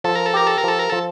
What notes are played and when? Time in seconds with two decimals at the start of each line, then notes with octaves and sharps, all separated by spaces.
0.04 F3 A4
0.15 A#4
0.26 A4
0.34 G4 A#4
0.47 A4
0.58 A#4
0.64 F3 A4
0.79 A#4
0.90 F3 A4